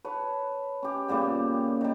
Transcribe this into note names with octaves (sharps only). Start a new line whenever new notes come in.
B4 C#5 A5
C#4 G4
A#2 C#3 G3 B3
D#3 G3